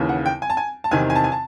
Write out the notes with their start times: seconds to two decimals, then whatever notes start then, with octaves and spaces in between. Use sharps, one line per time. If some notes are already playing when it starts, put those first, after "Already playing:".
Already playing: D#2 C#3 E3
0.09 F#5
0.26 G5
0.42 G#5
0.50 A5
0.57 G#5
0.84 A5
0.91 E2 C3 D#3 G#5
1.10 G#5
1.16 A5
1.24 G#5
1.32 A5